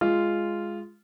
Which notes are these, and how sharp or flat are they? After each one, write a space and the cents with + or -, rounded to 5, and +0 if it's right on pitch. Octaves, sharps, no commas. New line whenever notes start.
G#3 +0 F4 -10